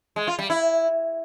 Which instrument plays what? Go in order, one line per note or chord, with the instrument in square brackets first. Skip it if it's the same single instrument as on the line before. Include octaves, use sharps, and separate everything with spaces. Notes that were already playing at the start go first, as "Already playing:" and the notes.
[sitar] G#3
F4
G3
E4